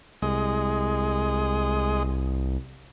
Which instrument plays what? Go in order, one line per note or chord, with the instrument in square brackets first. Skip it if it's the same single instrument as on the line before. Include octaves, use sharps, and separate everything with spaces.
[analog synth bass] C2 [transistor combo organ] G#3 D#5